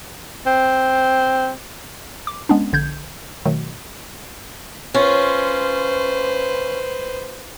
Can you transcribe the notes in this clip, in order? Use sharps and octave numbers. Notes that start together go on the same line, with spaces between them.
C4
D6
G#3 B3 C#4 D4
A#1 D3 G6 G#6
B2 D#3 F#3 A3
C#4 F4 B4 C5